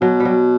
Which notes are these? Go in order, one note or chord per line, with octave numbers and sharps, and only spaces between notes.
B2 F#3
G3
F#3